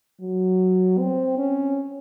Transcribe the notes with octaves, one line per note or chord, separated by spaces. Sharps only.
F#3
C4
C#4